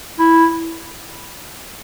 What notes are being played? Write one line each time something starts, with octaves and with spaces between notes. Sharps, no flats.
E4